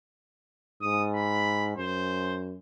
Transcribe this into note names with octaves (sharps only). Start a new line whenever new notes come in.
G#2 D#6
B5
F#2 C5